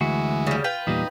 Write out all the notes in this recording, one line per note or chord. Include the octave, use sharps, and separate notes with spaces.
D2 E3 G#3 F#4
C#3 G3
F4 B4 G5
E2 A#2 G3 D#4